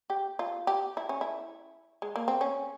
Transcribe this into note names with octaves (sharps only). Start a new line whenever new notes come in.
G4
F4
G4
E4
C#4
E4
G#3
A#3
C4
C#4